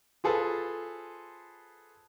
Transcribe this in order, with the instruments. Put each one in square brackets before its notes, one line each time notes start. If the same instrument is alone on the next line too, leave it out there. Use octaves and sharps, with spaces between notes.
[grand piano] F4 G#4 A4 B4 C5